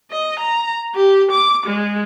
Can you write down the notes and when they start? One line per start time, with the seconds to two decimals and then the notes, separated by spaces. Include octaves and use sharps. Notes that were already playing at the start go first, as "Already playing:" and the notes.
0.11 D#5
0.40 A#5
0.95 G4
1.31 D6
1.66 G#3